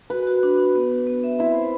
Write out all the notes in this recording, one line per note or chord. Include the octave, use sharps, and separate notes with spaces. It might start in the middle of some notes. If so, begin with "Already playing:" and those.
F#4 B4
F#4
D4
D4
B3
B3
B3
E5
C4 E4
C5